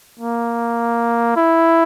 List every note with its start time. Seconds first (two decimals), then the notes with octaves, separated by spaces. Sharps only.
0.19 A#3
1.36 E4